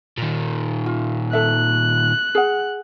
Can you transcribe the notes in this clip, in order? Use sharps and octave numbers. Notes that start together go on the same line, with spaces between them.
A#2 D#3
F4
A4 E5 F#6
G#4 F#5